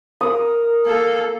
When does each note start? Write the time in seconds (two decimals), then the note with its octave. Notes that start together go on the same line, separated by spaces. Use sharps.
0.21 A#4 D#6
0.86 A#3 A4